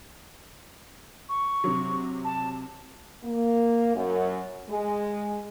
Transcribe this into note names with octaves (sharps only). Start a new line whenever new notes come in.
C#6
C3 F#3
A5
A#3
F#2
G#3